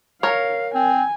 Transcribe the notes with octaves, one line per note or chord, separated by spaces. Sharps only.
A#4 C#5 F5
C4 G#5